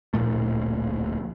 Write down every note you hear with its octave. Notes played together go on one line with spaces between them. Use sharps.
D1 A#1 A#2 A3